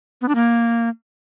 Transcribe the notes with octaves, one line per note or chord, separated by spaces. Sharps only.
B3
D4
A#3